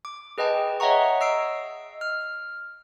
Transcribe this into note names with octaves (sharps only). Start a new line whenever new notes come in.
D6
G#4 B4 D#5 G5 A5
C#5 D#5 E5 F#5 A#5 C#6
D#5 E6 C7 D7
F6